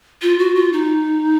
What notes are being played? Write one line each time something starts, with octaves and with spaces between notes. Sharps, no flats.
F4
F#4
F4
D#4